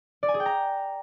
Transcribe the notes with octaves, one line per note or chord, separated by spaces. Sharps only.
D5
G#5
G#4
G5
A#5